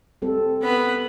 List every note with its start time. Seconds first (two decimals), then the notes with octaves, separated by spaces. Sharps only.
0.22 G3 C4 A4
0.63 B3 B5